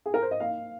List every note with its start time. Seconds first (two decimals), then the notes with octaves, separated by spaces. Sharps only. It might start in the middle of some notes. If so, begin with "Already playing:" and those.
0.06 G#4
0.14 A#4
0.22 C5
0.31 D#5
0.40 A#3 F5